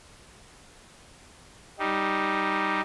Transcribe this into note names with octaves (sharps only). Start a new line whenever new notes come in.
G3 D#4